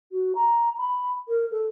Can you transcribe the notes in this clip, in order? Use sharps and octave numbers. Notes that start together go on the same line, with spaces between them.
F#4
A#5
B5
A#4
A4